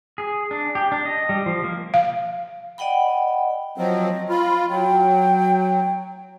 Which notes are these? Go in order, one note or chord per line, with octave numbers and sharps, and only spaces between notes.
G#4
D4
G4
D4
D#5
G3
F3
A#3
F5
D5 D#5 F#5 G5 B5
F3 F#3 C4 D#5
F4 B5
F#3 G5